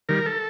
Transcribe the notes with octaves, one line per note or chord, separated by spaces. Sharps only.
D#3 G3 A#4
A4